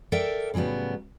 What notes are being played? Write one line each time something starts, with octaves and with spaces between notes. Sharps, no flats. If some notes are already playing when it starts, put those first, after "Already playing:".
A4 A#4 D5 E5 G5
A2 C#3 F#3 G3 B3